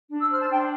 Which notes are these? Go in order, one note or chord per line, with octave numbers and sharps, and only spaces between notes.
D4
E6
C5 F6
A5
D4 G5